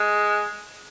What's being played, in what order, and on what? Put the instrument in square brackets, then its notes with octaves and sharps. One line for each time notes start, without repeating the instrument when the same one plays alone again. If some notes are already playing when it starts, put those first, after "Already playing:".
Already playing: [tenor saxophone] G#3